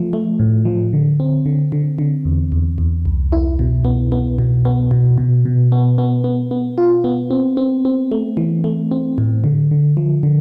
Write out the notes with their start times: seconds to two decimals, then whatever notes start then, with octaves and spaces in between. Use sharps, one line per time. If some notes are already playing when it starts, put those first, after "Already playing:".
Already playing: F3 A3
0.13 A3
0.39 A2
0.65 F3
0.93 D3
1.20 C4
1.46 D3
1.72 D3
1.98 D3
2.25 E2
2.52 E2
2.78 E2
3.05 C2
3.32 E4
3.59 B2
3.85 B3
4.12 B3
4.39 B2
4.65 B3
4.91 B2
5.18 B2
5.45 B2
5.72 B3
5.98 B3
6.24 B3
6.51 B3
6.78 F4
7.04 B3
7.31 C4
7.57 C4
7.85 C4
8.12 A3
8.37 E3
8.64 A3
8.91 C4
9.18 A2
9.44 D3
9.71 D3
9.97 F3
10.23 D3